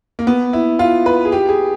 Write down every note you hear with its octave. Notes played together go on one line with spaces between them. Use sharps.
A#3
B3
E4
F4
B4
G#4
G4
G#4